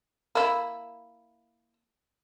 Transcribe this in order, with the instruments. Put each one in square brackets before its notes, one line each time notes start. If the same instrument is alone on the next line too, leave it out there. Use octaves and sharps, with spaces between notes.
[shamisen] A#3 E4